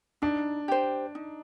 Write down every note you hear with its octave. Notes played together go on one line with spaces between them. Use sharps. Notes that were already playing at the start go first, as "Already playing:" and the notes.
D4 D#4
G4 C5
D#4